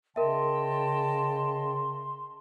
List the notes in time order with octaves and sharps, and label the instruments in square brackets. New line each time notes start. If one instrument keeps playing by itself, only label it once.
[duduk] C#3 [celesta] A#4 E5 [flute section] D#5 G5 A5 [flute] C6